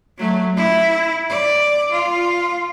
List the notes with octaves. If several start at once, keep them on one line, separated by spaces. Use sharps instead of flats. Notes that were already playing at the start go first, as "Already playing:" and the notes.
F#3 A3
E4
D5
F4